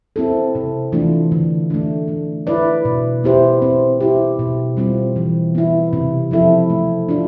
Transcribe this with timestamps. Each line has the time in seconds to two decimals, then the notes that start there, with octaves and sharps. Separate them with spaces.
0.16 C4 E4 A4
0.55 C3
0.92 E3 A3 D4 F4
1.32 D3
1.70 A3 D4
2.08 A3
2.47 E4 B4 D5
2.85 B2
3.24 B3 E4 G4 C5
3.62 C4
4.01 E4 G4
4.39 B2
4.77 G3 C4 F4
5.16 E3
5.55 B3 E4
5.93 C3
6.31 F3 C4 E4 A4
6.70 A3
7.09 D4 F4